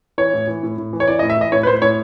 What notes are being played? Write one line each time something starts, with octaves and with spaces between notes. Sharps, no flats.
E3 C#5
A2
E3
A2
A2
E3
C#5
E3 D5
D#5
A2
E5
E3 D#5
A2 C#5
B4
A2 C5
A2 C#5